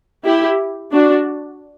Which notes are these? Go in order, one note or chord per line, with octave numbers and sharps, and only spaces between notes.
E4 G4
D4 F#4